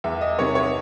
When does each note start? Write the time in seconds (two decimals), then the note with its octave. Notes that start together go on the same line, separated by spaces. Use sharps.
0.04 E2 E5
0.21 D#5
0.38 C3 D#3 C#5
0.55 C#5